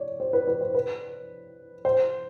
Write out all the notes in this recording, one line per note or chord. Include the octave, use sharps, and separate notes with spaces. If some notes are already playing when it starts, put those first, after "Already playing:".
Already playing: C#5 D5
C5
B4
B4
C5
B4
C5